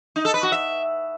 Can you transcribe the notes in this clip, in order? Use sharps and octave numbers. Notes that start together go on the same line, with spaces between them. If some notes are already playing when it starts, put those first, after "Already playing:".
D#4
A4
B4
F#4
E5